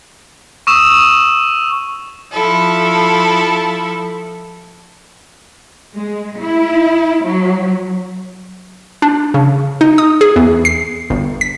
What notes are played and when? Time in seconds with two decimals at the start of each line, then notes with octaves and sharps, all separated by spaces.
0.67 C#6 D#6 E6 E7
2.31 F3 E4 A4
5.96 G#3
6.41 E4
7.25 F#3
9.02 D4
9.34 C#3
9.81 D#4
9.98 D#6
10.21 G#4
10.36 E2
10.65 C7
11.10 G1
11.41 B6